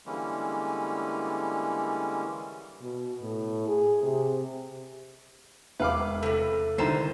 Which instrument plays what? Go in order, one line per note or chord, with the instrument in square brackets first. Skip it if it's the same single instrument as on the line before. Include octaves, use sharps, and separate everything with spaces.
[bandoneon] D3 E3 G3 G#3 A#3 C#4
[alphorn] B2
A2
G#4
C3
[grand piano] E1 [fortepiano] B4 F5 D6 [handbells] E5
[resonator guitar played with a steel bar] A2 C3 [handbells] A4
[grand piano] C2 D#3 A#5 [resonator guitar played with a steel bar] D3 C5